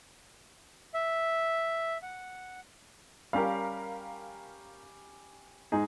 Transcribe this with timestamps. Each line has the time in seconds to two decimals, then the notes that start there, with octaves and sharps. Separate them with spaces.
0.94 E5
2.02 F#5
3.33 G3 C#4 G4 A#4 F5
5.72 G#2 D#4 G#4